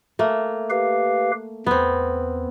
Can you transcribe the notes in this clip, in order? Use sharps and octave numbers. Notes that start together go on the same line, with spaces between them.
A3 A#3
G4 B4 F5
E2 B3 C4